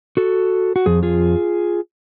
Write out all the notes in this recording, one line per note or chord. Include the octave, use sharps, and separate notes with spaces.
F#4 A4
F#4
F2 F3 G#4
F4 G#4